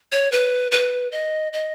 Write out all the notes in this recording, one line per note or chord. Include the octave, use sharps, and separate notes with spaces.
C#5
B4
B4
D#5
D#5